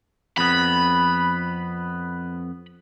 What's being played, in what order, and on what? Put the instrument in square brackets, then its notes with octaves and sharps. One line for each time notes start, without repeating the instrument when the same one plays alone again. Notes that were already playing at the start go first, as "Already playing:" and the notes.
[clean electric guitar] F2 B3 [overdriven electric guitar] B5